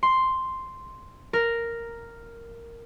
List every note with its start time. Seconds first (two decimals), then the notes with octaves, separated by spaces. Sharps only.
0.03 C6
1.33 A#4